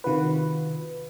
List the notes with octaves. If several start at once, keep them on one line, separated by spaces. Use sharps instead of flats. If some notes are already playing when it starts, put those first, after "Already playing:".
C3 D#3 F4 F#4 B4